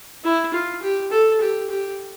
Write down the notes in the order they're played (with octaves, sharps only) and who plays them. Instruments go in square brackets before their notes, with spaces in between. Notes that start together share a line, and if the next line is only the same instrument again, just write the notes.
[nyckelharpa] E4
F4
G4
A4
G4
G4